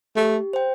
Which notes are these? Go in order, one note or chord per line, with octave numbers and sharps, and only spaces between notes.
A3 G4
C5 G5